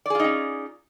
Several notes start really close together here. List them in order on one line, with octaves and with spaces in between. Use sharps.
D5 G#4 F4 D#4 C#4